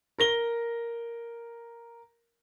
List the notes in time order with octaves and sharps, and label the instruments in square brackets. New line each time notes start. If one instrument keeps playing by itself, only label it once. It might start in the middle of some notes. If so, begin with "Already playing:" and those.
[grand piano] A#4 A#6 G7